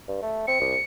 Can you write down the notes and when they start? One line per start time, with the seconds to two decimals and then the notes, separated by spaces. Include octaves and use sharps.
0.08 G2
0.22 A3
0.47 C4 C#7
0.60 C2